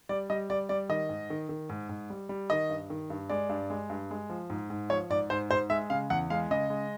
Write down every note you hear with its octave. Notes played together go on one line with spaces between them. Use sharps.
G3 D5
G3 D#5
G3 D5
G3 D5
D#3 D#5
G#2
D#3
D#3
G#2
G#2
G3
G3
D#3 D#5
G2
D#3
G2
G#3 D5
G2
G#3
G2
G#3
F3
G#2
G#2
F3 C#5
G#2 D5
G#2 C5
G#2 C5
G#3 E5
C#3 F5
E2 F#5
G#3 F5
C#3 D#5
G#3